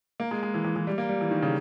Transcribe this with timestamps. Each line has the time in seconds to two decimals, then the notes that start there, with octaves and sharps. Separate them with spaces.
0.20 A#3
0.31 G#3
0.43 G#3
0.54 E3
0.64 E3
0.76 E3
0.87 G3
0.98 A#3
1.09 G3
1.21 E3
1.31 D#3
1.42 C#3